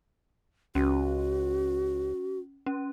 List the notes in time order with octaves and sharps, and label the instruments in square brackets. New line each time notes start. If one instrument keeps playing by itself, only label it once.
[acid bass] C#2 [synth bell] C#4 [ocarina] F#4
[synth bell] C#4